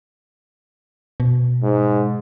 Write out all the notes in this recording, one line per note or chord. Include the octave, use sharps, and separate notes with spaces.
B2
G#2